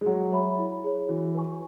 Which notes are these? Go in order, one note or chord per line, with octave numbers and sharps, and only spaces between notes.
G#3
F#3 G#4
C#5 E5 B5
E4
G#4 C#5
E3 F#4
B4 G#5 C#6